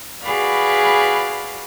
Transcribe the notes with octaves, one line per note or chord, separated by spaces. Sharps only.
F#4 G#4 B4 D5 F5 B5